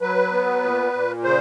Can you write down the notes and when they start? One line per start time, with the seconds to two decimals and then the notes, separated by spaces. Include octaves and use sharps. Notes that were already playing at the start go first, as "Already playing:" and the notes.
0.01 F#3 B4
0.32 B3
0.63 A#2
0.93 A#2
1.23 C#3 C5